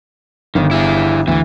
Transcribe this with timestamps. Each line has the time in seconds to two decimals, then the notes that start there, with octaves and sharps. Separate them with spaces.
0.55 G1 D#3
0.71 E4 G#4
1.28 D2 E3